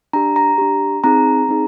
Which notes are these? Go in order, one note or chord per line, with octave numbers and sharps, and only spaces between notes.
D4 G4 A#5
A#5
D4 G4
C4 D#4 G#4 A#5
C4 D#4 G#4